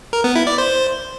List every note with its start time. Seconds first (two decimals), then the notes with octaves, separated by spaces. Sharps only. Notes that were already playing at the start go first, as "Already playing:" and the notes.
0.13 A#4
0.24 B3
0.36 E4
0.47 D5
0.58 C5